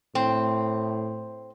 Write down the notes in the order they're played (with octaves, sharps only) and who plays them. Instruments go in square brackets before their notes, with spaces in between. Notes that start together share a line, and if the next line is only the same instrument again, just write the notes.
[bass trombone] A2 [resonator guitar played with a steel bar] C4